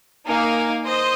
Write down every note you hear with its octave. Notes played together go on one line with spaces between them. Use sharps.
A#3 D#4 A#4 F5 G#5
C5 D#5